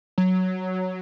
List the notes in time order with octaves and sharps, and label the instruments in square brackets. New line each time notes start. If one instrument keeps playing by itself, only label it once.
[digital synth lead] F#3